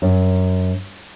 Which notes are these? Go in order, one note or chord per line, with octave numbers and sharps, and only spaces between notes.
F#2